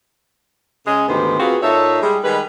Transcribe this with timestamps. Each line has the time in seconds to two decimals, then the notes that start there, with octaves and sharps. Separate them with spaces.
0.86 C#3 G#3 G#4
1.09 D2 G#2 D#3 B3 G4 C5
1.40 A#3 C4 F4 F#4 G#4 B4
1.63 A#2 D#4 A4 C#5 E5
2.01 G3 G#3 G#4
2.24 D#3 G3 G#3 B4